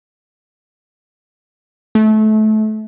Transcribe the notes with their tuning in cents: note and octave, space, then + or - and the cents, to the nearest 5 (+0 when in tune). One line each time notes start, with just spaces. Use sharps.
A3 -25